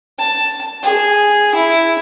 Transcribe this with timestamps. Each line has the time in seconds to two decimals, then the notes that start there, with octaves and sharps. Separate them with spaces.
0.18 A5
0.83 G#4
1.54 E4